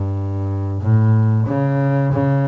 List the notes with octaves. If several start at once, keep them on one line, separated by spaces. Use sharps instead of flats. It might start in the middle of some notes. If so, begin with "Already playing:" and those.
Already playing: G2
A2
C#3
C#3